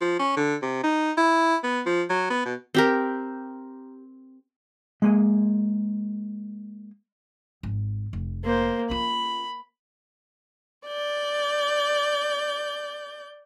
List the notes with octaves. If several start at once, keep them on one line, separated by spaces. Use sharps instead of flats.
F3
C#4
D3
C3
D#4
E4
B3
F3
F#3
B3
B2
C4 G4 A#4
G#3 A#3 G#5
G#1
F1
A#3 C5
C#4 F4 B5
D5 G6